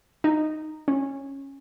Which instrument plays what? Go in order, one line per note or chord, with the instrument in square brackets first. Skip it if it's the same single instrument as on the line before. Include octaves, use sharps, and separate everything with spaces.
[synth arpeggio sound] D#4
C#4